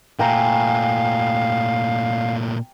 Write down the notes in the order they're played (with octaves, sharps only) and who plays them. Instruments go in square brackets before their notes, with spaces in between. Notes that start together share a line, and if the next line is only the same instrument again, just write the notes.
[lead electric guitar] A#2 A3 [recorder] F5 [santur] G5 G#5 A#5